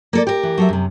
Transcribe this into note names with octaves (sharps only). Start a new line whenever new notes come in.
A#3 A4 D5
G4 A#4
E3
F#3 A4 E5
F#2 C3